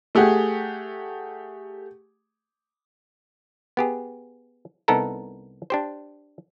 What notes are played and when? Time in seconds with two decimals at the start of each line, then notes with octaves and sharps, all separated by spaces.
0.15 A3 G4 G#4 F#5
3.77 B3 G4 G#4
4.88 C2 B3 D#4 A4 A#4 A#5
5.70 D4 G4 C5